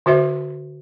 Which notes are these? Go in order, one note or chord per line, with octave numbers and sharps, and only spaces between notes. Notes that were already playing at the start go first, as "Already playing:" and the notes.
D3 F#4 C5 E5